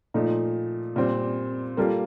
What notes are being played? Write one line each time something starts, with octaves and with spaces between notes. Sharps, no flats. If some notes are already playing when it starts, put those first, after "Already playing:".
A#2 F3 A3 D#4
A#2 G3 C4
G3 A#3 F4 A4